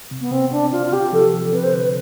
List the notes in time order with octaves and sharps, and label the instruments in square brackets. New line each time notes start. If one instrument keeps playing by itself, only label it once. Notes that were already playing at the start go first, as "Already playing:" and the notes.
[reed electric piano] C3
[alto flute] B3
[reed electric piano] C3 [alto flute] C4
[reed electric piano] C3 [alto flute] D4
[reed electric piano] C3 [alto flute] F4
[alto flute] F4
[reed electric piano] C3 [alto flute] G4
[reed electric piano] F3 [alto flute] A4
[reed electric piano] F3
[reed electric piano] C3 [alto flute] B4
[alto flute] C5
[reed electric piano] D3 [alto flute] B4